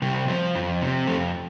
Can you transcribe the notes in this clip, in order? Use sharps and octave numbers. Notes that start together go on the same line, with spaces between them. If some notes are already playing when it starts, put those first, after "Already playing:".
C3 G3
F3
F2
C3
F2 A3